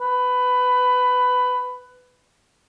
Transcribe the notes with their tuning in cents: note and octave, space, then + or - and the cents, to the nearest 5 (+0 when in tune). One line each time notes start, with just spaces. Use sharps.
B4 +15